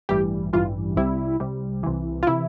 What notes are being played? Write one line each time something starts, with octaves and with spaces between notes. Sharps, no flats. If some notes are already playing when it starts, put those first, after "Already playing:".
A1 G2 E3 G3 G4
A1 G2 E3 G3 F4
C2 C3 G3 E4
C2 C3 G3
C2 C3 E3
F4
C3 E3 E4